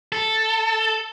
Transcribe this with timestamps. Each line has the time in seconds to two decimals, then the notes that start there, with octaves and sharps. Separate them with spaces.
0.12 A4